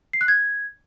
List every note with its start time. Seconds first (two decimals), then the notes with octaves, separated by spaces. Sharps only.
0.13 C7
0.21 F#6
0.28 G#6